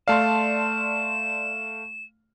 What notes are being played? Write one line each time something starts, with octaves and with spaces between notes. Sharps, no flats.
A3 D5 F5 A5 C6 E7